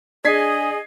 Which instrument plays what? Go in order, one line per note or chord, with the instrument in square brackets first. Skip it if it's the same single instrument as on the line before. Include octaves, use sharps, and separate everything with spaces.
[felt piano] D4 [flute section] G#4 [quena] D#5 [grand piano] G#6 B6 C7